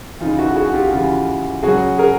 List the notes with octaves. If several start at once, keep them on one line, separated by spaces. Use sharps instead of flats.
C#3 E3 D#4 F4
E4 F#4
F#4 G#4
F4 G4
C#3 E3 F4 G4
C#3 F#3 F#4 G#4
G#4 A#4